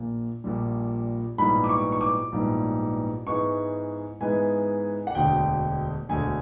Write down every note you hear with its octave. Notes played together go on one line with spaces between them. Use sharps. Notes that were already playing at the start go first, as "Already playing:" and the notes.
Already playing: A#1 A#2
A#1 A#2 G3
A#1 G#2 E3 G3 B3 B5
D6
C#6
C#6
D6
A#1 G#2 E3 G3 B3
G#2 E3 G#3 B3 C#6
G#2 E3 G#3 B3 G#5
F#5
E1 D2 D3 G5
E1 D2 D3 G#5